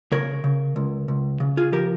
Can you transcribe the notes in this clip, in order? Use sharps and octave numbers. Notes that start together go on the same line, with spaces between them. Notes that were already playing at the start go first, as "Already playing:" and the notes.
C#3 A#4 C#5
C#3
C#2
C#2
C#3
F4 G#4
F3 G4 A#4